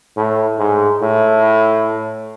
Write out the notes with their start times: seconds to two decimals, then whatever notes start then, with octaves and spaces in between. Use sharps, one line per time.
0.17 A2
0.59 G#2
1.02 A2